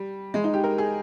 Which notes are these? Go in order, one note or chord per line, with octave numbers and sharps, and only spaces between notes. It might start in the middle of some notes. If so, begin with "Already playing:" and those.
Already playing: G3
G#3
D#4
G4
A#4
G#4